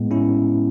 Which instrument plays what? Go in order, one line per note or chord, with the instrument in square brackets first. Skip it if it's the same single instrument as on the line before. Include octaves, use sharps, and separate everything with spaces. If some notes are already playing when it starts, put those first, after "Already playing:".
Already playing: [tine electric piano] A2 G#3 B3
C#4 E4